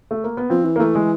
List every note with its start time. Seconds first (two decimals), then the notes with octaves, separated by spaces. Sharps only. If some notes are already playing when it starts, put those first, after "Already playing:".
0.11 A3
0.24 A#3
0.37 B3
0.50 F3 C4
0.65 E3
0.76 A#3
0.79 E3 A3
0.95 G#3